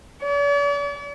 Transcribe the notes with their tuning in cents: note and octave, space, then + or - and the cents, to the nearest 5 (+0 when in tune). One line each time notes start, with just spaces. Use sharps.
D5 -45